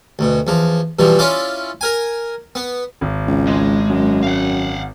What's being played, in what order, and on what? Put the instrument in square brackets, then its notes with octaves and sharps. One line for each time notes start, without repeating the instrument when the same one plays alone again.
[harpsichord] D2 B2
E2 F3
G2 B2 E3 F3
C#4 E4 F4 D5
A#4 G#5
B3
[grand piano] G#1
[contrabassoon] C#2
[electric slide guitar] G#3
[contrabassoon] F#2
[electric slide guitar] F5 F#5